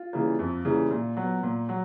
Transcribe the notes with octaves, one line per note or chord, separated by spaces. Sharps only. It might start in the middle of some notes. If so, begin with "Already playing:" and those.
Already playing: F4
C#3 E3 G3 A#3
F2
C#3 E3 G3 A#3
A#2
F#3 B3
A#2
F#3